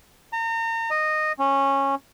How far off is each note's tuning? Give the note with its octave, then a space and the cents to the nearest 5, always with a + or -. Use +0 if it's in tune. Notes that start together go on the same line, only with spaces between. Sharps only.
A#5 -35
D#5 -15
C#4 -15